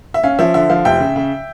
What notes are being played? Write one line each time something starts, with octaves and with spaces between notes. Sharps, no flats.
E5
C#4 F5
F3 E5
D3 E5
F3 F5
F1 E5 G5
C#3
C#3